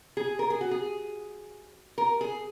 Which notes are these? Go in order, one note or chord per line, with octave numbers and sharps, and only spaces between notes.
G#4
A#4
G#4
F#4
G#4
A#4
G#4